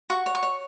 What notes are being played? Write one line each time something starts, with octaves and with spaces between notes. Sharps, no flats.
F#4 C#6
C#5
C#6
C#5